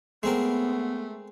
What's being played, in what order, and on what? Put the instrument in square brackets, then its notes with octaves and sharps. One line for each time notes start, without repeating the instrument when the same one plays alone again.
[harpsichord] G#3 C4 A#4 [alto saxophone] A3 [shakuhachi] B3